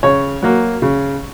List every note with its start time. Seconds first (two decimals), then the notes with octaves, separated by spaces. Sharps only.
0.03 C#3 C#5
0.43 F#3 A#3
0.82 C#3